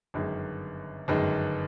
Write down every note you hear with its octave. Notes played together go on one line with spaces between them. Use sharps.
G1 F#2 D#3 G#3
G1 F#2 D#3 G#3